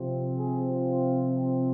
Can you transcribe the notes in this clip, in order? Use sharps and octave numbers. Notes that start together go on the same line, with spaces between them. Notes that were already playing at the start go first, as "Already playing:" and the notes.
Already playing: C3 F3 C4
G#4
F4